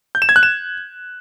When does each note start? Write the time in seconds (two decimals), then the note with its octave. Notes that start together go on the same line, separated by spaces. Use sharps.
0.15 G6
0.22 E7
0.29 G#6
0.36 F#6
0.43 E7